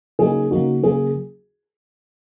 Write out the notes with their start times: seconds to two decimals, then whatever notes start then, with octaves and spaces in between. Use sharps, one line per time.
0.19 C#3 F#3 A#3 D#4 G#4
0.51 C#3 F#3 A#3 D#4 F#4
0.83 C#3 F#3 A#3 G#4